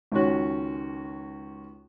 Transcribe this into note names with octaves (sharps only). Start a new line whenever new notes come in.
C#2 D#3 C#4 F#4